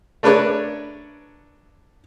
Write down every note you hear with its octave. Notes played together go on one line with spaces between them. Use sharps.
A3 D4 A#4 B4 C#5 D5